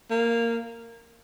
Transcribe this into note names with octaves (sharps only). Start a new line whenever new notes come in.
A#3